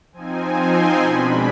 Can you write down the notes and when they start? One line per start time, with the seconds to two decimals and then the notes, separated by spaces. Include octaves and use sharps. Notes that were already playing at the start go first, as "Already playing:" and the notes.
0.13 F3 C4 D#4 G#5
0.56 C6
1.00 B2 G#3 D4 B5